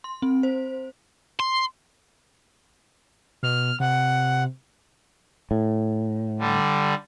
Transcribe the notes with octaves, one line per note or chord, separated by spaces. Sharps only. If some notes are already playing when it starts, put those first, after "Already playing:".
C6
C4
C5
C6
B2 F6
C3 F#5
A2
D3 G3